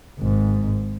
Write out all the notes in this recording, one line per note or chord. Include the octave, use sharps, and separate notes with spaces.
G#1 G#2